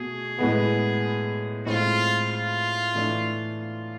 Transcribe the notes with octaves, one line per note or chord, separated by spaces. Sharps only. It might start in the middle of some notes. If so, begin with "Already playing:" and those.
Already playing: B2 A3 G#4
A2 G#3 B3
A2 G#3 C4 F4
F4
A2 E3 A3 D4
F4